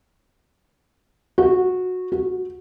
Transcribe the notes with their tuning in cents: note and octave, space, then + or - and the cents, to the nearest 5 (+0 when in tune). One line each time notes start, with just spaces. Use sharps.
F#4 -15
F#4 -15